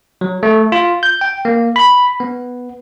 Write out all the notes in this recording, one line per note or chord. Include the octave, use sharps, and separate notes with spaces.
F#3
A3
F4
G6
G5
A#3
B5
B3